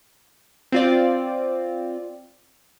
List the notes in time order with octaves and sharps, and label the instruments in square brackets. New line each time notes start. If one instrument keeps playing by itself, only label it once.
[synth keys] C4 F4 D5